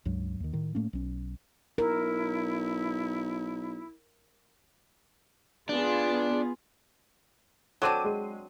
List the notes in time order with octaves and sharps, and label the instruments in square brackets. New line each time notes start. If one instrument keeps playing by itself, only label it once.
[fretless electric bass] C#2 G2 F#3
D#2 D#3
A2 D#3
A2 A3 A#3 C#4
B1 C#4
[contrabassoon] B1 [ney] E4 [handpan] A#4
[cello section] B3 F4 G#4 [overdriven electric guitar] D4
[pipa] F#3 C4 D4 [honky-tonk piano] A4 D6 D#7
[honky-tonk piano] G#3